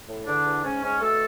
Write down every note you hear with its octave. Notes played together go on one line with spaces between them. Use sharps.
A2
E2 D3 D4
E2
G#2 C#4
G#2 C#4
B2 A3 A4